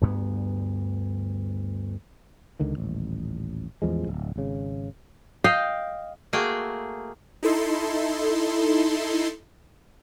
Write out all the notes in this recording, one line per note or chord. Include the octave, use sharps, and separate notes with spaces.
D2 G2 B3
C#2 D3 D#3
D#1 A1
A1 E2 F3 G#3
D1
G#1 C#3
D#5 F5 G5
A3 A#3 F#4 G#4 G5
D#4 E4 A4 C6